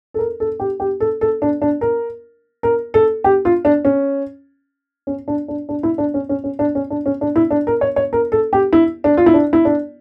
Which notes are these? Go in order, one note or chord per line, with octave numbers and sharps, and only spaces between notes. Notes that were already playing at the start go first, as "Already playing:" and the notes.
A4
A#4
A4
G4
G4
A4
A4
D4
D4
A#4
A#4
A4
G4
F4
D4
C#4
C#4
D4
D4
D4
E4
D4
C#4
C#4
C#4
D4
C#4
D4
C#4
D4
E4
D4
A#4
C#5
C#5
A#4
A4
G4
E4
D4
F4
E4
D4
E4
D4